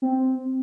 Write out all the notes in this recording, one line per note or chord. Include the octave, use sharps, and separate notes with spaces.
C4